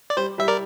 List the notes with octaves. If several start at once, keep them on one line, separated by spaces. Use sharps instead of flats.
D5
G3 C5
G3 E5
A#4 D5